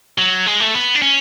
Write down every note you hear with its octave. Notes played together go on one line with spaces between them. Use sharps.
F#3
G#3
A3
B3
D4
C#4